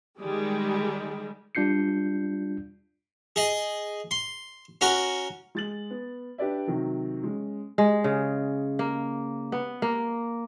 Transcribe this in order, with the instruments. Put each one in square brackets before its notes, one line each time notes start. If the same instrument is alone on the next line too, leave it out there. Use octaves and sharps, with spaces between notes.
[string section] D#3 G3 G#3
[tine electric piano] G3 D4 F4 G6 C7 C#7
[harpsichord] G#4 D#5
C6
C#4 F#4 A#4
[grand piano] G#3 A6 F#7
B3
D4 G4 B4 D5 E5
C3 D#3 F#3
G#3 C#4
[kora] G#3
C#3
A#3
B3
A#3